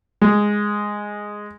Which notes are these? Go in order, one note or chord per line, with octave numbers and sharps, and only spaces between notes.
G#3